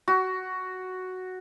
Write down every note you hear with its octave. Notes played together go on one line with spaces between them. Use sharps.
F#4